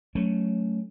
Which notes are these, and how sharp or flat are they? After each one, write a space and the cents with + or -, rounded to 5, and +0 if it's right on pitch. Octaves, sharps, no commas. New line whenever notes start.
F#3 +5 A3 +0 C#4 +0